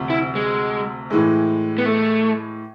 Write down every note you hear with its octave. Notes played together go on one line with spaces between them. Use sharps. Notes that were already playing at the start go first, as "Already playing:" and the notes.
Already playing: D2 C3 F3
E4
G#3
A2 E3 G#3
B3
A3